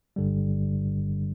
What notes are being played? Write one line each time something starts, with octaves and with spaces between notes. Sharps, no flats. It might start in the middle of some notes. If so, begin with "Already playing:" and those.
G1 G2 D3 G3